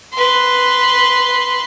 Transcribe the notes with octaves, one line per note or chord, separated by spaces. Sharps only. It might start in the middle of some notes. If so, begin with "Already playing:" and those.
B4 C6